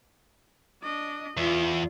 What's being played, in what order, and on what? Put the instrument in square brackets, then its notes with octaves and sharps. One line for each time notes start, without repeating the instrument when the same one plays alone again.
[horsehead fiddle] D4 D#5
[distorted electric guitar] E2 [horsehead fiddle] F4